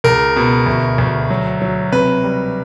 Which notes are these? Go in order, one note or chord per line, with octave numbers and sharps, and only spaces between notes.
C#2 A#4
B2
D2
D2
F#3
F#3
C3 B4
G3